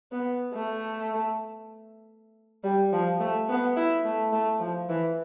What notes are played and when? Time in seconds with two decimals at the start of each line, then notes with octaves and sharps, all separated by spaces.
0.12 B3
0.53 A3
2.64 G3
2.92 F3
3.20 A3
3.48 B3
3.76 E4
4.05 A3
4.32 A3
4.60 F3
4.89 E3